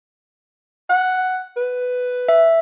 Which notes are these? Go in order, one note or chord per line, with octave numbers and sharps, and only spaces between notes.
F#5
B4
E5